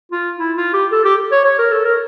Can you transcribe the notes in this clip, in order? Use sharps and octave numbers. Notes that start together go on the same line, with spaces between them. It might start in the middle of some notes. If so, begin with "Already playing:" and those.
F4
E4
F4
G4
A4
G4
C#5
C#5
A#4
A4
A#4